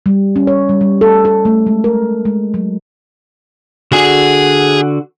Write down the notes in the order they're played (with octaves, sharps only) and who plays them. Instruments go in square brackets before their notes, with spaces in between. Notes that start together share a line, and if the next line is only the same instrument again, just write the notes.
[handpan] G3
C#4
C#5
G3
G3
A4
A4
A3
G#3
A#4
G#3
F#3
[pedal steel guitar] D3 F#4 [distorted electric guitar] G#4 G#5